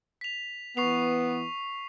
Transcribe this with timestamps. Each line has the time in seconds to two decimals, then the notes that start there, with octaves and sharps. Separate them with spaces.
0.21 B6 F7
0.77 E3 B3 C#6 C7 F7